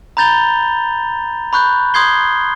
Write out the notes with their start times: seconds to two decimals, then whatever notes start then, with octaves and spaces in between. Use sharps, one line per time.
0.17 A#5 B5 G6 A6 F7 G7
1.53 B5 C#6 F#6 G6
1.94 C6 D#6 G6 G#6 C7 G7